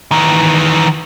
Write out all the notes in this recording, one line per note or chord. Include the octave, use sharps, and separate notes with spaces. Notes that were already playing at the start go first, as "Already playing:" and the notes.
D#3 E3